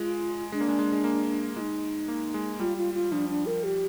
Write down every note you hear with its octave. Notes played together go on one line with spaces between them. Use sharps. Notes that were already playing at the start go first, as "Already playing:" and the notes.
Already playing: G#3 F4
G#3 D4
A#3
G#3
G#3
G#3
A#3
G#3 D#4 F4
A#3
G#3
G3 F4
F4
F4
F3 D4
D4
A#4
G4